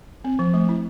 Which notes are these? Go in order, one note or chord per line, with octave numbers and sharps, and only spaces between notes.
C4
F3
A3
E4